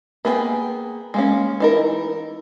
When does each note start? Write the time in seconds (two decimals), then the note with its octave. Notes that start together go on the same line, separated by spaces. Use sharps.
0.25 A#3 B3 G#4 B4 G5
1.14 G#3 A#3 C#4
1.60 E3 D#4 A#4